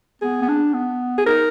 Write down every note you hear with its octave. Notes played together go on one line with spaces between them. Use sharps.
B3 G#4
B3
D4
B3
G#4
D#4 A#4